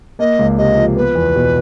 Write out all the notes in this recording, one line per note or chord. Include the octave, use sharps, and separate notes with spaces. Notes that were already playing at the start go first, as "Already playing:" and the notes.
A#3 D#5
C#2
C3 D#5
F3
B3 B4
E2
B2